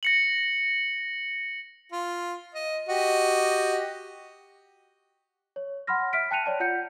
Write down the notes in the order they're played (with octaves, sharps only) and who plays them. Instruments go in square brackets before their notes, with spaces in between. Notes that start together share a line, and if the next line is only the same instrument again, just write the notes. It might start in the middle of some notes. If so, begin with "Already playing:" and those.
[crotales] A#6 C#7 F#7
[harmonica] F4
D#5
F#4 G4 D#5
[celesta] C#5
F#5 B5 C6 F6 A#6
E5 F6 B6 D7
G5 A5 F#6 C#7 D#7 F7
C#5 D5 A5
F4 F#5 G6 C#7